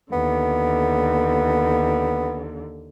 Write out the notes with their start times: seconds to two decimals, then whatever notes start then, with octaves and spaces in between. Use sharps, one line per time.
0.12 D#2 D3 B3